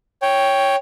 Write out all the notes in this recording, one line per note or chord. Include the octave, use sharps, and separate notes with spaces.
C#5 G5